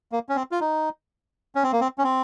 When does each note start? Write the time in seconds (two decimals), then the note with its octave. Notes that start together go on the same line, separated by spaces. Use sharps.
0.12 A#3
0.29 C#4
0.36 C4
0.52 F4
0.61 D#4
1.55 C#4
1.63 C4
1.72 A#3
1.81 C4
1.98 C#4
2.04 C4